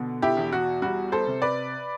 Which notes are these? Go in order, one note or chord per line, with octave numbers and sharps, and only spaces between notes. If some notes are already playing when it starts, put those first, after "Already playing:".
Already playing: B2 D3
E4 G4
E2
F#4
G3 F#4
A4 C5
C3
B4 D5